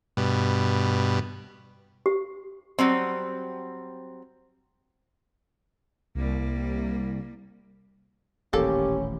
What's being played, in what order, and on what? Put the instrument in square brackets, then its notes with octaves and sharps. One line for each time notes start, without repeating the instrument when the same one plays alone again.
[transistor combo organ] G2 B2
[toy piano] G4
[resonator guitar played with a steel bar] F#3 G3 C4
[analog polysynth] C2 [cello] G3 A#3
[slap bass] D#1 A1 [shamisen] A#3 A4 [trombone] C#4 [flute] G4